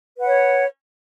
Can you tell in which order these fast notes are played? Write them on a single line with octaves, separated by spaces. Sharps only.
B4 F#5 C#5